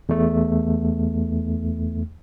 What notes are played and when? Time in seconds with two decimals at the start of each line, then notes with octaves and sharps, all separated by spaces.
0.09 E2 A3